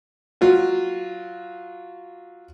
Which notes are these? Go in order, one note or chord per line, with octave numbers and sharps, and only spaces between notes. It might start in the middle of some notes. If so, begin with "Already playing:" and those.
F#3 F4 F#4